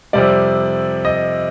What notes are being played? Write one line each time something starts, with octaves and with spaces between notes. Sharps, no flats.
F2 C3 G3 D5
D#5